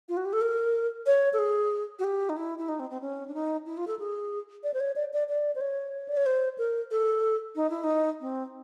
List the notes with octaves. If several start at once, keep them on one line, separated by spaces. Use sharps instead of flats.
F4
F#4
G4
A4
A#4
C#5
A4
G#4
F#4
G4
D#4
E4
E4
D#4
C4
C4
C#4
D4
D#4
E4
F4
A4
G#4
D5
C5
C#5
D5
D5
D5
C5
C#5
D5
C#5
C5
A#4
A4
D#4
E4
D#4
C4